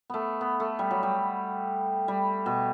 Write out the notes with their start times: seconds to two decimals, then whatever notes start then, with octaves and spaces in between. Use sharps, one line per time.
0.10 A3 B3
0.41 B3
0.60 A3
0.79 G3
0.91 F#3
1.03 G3
2.08 G3
2.46 B2